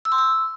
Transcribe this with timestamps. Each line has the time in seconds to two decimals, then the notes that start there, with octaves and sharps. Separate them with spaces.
0.05 E6
0.12 C6
0.18 E6